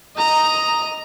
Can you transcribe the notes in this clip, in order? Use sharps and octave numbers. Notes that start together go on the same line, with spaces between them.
D#5 A#5